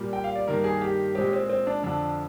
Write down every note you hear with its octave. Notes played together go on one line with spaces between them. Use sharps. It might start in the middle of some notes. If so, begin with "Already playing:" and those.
Already playing: A#2 G3 A#3
G5
F5
D5
G2 D#3 G3 A#3 A#4
G#4
G4
A#2 G#3 C4 G4
C4
C4
D4
F2 D3 F3 D4